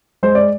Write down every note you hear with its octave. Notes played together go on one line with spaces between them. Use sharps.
G#3 C5
D5